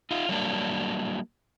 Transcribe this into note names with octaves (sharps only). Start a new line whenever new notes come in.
D#4 F4
F#3 G3 A#3 D4